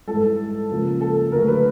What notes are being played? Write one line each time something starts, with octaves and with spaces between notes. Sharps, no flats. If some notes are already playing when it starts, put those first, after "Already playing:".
G#2 E3 G3 A4
C#2 C#3 F3 A#3
A4
D2 D3 F#3 A#4
B4